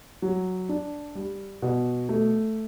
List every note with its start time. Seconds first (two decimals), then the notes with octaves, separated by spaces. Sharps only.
0.22 F#3
0.69 D4
1.15 G3
1.62 B2
2.09 A3